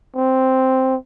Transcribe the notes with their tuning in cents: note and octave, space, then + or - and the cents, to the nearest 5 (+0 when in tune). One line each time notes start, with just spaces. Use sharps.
C4 +0